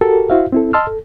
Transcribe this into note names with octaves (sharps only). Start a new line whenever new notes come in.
F#4 G4 A4 A#4
E4 F#4 C5 E5 F5
C4 E4 A4
D#5 A5 C6 E6 F6
A4